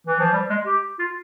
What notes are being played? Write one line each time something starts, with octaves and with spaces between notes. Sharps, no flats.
E3
F3
G3
G#3
G4
F4